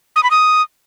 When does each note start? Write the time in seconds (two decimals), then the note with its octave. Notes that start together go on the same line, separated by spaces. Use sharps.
0.16 D#6
0.23 B5
0.31 D#6